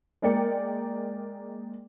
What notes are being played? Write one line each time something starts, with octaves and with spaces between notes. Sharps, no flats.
G#3 A#3 A#4 D5 G5 C#7